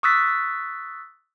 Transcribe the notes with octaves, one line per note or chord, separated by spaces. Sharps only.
C#6 D#6 E6 F#6 A6 B6